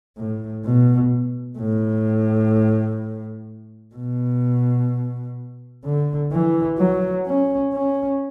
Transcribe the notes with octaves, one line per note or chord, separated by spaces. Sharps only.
A2
B2
A2
B2
D3
E3
F#3
C#4
C#4